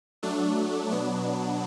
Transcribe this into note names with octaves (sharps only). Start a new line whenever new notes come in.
F#3 A3 D4
B2 F#3 B3 D4